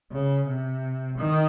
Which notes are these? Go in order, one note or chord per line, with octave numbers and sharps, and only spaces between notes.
C#3
C3
D#3